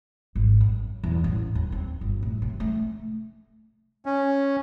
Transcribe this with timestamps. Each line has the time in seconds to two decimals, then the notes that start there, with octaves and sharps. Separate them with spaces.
0.35 G#1
0.61 F#2
1.04 E2
1.24 A1
1.55 D#2
1.72 C4
2.01 G1
2.23 A2
2.42 C3
2.60 A3
4.06 C#4